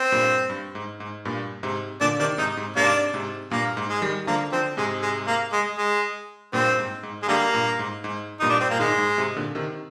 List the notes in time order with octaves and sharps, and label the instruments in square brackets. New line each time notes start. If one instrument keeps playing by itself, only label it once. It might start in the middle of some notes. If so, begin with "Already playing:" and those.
Already playing: [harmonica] C4
[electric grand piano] G2 A#2
G2
G#2
G#2
G2 A#2
G#2 C3
[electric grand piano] A#2 D3 [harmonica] D4
[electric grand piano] C3 D#3 [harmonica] D4
[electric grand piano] G#2 C3 [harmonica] D#4
[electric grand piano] G#2
[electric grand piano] G#2 C3 [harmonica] A#3 D4
[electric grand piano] G#2 C3
[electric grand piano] G2 A#2 [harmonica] A#3
[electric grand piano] G#2
[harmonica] G#3
[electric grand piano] D#3 G3
[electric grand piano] D3 F3 [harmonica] A#3
[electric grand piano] D3 F3 [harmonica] C4
[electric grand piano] G#2 C3 [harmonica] G#3
[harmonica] G#3
A#3
G#3
G#3
[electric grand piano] G2 A#2 [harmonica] C4
[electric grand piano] G#2
G#2
[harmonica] G#3
D3 G3 A#3
[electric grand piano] G2 A#2
G#2
G#2
[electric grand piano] G2 A#2 [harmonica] D#4
[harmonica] D4
C4
[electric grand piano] A#2 [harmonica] A#3
[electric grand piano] G#2 [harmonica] D#3 G#3
[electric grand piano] G#2
G#2 C3
A#2 D3
C3 D#3